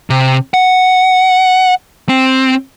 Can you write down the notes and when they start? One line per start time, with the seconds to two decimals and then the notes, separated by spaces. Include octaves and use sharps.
0.10 C3
0.54 F#5
2.09 C4